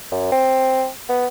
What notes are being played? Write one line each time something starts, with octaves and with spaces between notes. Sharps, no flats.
F#2
C4
B3